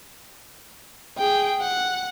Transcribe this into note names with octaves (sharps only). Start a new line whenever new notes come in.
G#4 G5
F#5